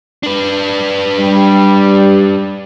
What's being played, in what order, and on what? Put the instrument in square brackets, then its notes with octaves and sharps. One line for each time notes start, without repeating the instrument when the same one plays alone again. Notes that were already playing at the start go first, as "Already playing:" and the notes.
[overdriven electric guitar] D4 B4
[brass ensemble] G3